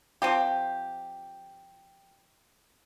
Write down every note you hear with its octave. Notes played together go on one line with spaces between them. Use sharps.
F3 C4 G4